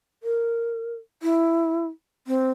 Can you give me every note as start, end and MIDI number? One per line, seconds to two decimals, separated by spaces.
0.23 0.94 70
1.23 1.86 64
2.27 2.51 60